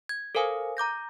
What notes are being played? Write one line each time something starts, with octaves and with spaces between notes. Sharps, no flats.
G#6
A4 A#4 C5 F5 G#5 D#6
A#5 D6 G6 A#6